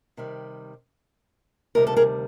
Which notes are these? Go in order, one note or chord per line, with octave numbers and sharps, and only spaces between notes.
C3 D#3 G3
D2 C3 D#3 G3 A#4
A4
G#4 A#4